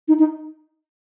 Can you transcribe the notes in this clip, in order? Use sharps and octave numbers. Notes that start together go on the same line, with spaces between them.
D#4
D#4